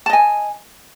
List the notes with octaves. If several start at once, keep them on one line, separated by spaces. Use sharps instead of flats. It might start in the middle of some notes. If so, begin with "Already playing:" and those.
D#5 G#5 A5